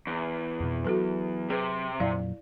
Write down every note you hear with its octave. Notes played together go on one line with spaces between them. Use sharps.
E2
F2 B2
F#3 F#4 A4 B4
C3 G#4 B4
F2 A#2 F#3 E4 D5 F5